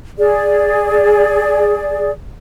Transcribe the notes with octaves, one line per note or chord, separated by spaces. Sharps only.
G#4 D5